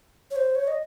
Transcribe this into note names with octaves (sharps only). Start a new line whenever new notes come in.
C#5
C5
C#5
D#5